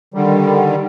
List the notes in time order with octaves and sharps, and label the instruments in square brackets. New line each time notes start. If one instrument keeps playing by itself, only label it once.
[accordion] D3 D#3 G3